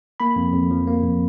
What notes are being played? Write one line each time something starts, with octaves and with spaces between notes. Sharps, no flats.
A#3 B5
F2
F2
F3
A#3
F2